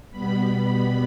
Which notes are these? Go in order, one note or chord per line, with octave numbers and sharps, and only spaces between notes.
B2 G3 B3 B5